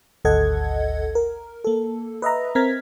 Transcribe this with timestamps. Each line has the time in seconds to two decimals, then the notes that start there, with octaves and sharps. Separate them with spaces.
0.25 G#1 D2 A4 D#5 F#5 G#6
1.15 A#4
1.64 A#3 A4
2.22 B4 D#5 E5 A#5
2.55 C4 A#4 A#5 F6 G#6 B6